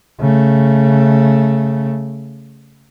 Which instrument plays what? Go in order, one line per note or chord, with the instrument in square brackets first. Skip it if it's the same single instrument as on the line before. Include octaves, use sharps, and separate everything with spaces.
[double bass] C#3 A3